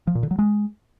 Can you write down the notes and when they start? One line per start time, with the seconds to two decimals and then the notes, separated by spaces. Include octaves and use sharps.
0.07 F3
0.15 A#2
0.23 D3
0.31 F#3
0.39 G#3